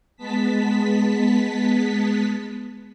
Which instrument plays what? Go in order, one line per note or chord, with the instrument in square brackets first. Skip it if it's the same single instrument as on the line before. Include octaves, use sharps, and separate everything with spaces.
[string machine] G#3 B3 A5 B6